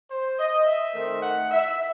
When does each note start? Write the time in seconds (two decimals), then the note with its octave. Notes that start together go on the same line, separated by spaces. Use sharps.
0.10 C5
0.39 D#5
0.66 E5
0.94 D#3 A3 C4 D#4
1.22 F#5
1.51 E5